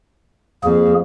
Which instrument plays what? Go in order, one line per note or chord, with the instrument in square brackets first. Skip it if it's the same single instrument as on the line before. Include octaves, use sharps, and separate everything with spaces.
[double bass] F2 [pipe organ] A#3 G#4